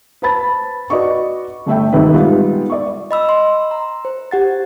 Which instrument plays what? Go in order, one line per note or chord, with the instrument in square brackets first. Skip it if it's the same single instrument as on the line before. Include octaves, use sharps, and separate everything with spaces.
[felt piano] B4 C5 A5 B5 A6
F#4 B4 D5 D#5 C#6
G1 A3 E5 G5
D#1 G#1 C3 D#4 B4 E5
G3 G#3 B3 D#4 F4
D5 C#6
[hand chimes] D#5 B5 E6
C6
A#5
C5
G4 F#5 A6